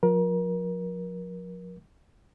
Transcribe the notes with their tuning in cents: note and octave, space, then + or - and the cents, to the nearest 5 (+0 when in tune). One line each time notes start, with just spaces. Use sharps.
F3 +40 A#4 +30